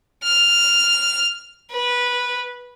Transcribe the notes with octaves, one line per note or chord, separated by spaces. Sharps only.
F6
B4